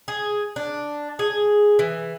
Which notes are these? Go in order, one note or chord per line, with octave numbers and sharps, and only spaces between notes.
G#4
D4
G#4
E3